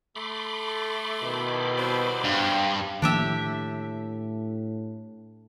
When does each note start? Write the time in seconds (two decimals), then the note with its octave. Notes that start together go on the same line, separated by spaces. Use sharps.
0.16 A3 B5 C6 D6
1.21 B2 D#3 E4
1.78 G3 B3 C4
2.24 G2
3.02 A2 D#3 F3 A#3 D4 G4 E5